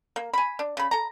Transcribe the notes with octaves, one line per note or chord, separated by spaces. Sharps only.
A#3
G#5 B5
D4
C#3 B5
A4 A#5